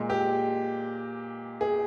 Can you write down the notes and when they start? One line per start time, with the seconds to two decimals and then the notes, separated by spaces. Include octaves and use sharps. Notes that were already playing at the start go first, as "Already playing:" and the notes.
Already playing: A#2 G#3
0.10 G4
1.61 G#4